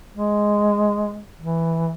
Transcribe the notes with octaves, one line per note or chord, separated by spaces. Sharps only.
G#3
E3